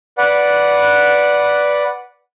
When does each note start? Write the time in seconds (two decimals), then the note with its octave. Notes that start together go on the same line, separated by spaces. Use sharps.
0.18 B4 D5 F#5